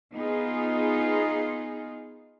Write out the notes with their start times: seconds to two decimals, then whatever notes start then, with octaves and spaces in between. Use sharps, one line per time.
0.14 B3 D#4 F4 G#4